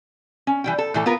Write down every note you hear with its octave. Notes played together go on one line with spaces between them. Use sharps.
C#4
E3 G3 G5
A4
A2 E3 A4
B3 F4 A#4 B4